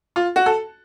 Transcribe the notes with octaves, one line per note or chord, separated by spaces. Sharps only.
F4
F#4
A4